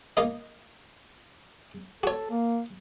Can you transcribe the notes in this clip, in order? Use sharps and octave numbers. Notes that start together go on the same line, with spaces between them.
A#3 D#4 D#5
F#4 A4 C#5
A#3